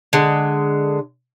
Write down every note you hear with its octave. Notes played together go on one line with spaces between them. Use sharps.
D3 G#3